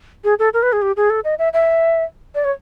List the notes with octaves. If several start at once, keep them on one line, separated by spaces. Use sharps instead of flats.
G#4
A4
A#4
B4
G#4
G4
G#4
A4
D#5
E5
E5
D5
C#5